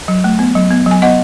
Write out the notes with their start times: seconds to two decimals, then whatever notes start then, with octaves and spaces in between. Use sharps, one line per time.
0.08 F#3
0.24 A3
0.39 B3
0.55 F#3
0.71 B3
0.86 F#3
0.91 G#5
1.02 B3 D#5 F#5